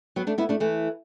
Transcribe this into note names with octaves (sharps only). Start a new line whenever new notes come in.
F#3 B3
A3 D4
B3 E4
A3 D4
E3 A3